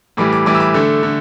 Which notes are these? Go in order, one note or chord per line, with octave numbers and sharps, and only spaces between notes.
A2 E3 G3 D6
D6
A2 E3 G3 D6
E6
D6
D3 A3
D3